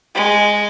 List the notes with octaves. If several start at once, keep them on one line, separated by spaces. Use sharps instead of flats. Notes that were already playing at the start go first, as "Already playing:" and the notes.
G#3